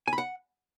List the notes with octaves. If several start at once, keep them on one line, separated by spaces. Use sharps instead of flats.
G#5
B5
F#5